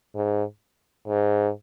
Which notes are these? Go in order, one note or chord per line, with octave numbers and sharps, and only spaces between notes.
G#2
G#2